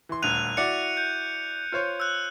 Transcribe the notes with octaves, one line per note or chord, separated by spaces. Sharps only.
E3 C6
D#1 D2 F#6 D#7 F7
E4 F#4 D5 C#7
G6
F4 C5 C#5
E6 F#6